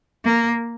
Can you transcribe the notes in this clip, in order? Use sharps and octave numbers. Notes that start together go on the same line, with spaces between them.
A#3